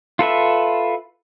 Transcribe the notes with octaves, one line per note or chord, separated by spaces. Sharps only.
F4 A4 B4 E5